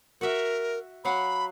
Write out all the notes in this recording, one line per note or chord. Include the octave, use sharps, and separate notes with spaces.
F#4 A#4 E5
F#3 F5 F#5 B5